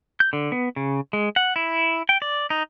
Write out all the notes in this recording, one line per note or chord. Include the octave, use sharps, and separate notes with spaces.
G6
D3
B3
C#3
G#3
F#5
E4
G5
D5
D#4